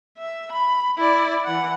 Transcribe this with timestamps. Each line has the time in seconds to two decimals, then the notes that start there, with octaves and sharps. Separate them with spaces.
0.18 E5
0.52 B5
0.98 E4 D5
1.44 E3 F#5